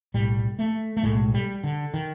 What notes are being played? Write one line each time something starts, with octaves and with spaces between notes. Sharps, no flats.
B1 A2 G3
A3
A3
B1 A2 G#3
G3
D3
D#3